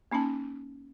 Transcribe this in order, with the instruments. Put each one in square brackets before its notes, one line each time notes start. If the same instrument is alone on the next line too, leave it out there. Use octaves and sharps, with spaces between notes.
[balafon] A#3 C#4 D#4 A5